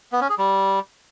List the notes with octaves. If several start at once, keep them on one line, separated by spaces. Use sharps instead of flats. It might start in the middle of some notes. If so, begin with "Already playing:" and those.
B3
C#4
G#4
G3